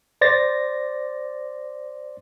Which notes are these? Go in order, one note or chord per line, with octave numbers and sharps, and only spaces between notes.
C5 D5 A6 A#6